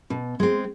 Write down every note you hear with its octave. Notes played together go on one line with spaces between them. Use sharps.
B2
G#3 C4